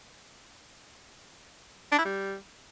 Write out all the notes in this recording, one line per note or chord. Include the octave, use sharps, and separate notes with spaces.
D4
E4
G3